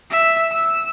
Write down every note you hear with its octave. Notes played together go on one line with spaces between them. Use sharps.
E5
E6